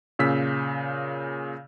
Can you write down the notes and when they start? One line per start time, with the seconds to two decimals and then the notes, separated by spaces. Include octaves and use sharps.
0.19 A#2 C#3 E6 B6